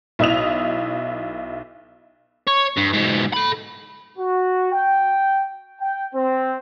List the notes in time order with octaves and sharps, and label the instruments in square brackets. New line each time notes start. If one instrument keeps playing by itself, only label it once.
[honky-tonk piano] B1 E4 D#5 D#6 F7
[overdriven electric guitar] C#5
G2
G#2 B2
A4 B5
[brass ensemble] F#4
G5
G5
C4